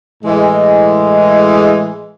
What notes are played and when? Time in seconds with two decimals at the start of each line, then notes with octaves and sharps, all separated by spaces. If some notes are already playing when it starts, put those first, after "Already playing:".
0.24 A2 E3 G#3